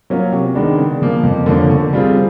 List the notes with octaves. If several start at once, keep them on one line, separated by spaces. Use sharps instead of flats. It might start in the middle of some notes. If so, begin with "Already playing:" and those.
F#3 A#3 C#4 F4
C3
D#3 G#3 B3 D4
C#3
F3 A#3
F2
D3 F3 A#3 C#4
D3
G3 C4 F4 G#4